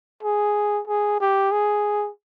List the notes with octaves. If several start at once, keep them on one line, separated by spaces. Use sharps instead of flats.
G#4
G#4
G4
G#4